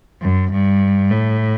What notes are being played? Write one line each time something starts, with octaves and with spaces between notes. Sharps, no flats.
F#2
G2
A2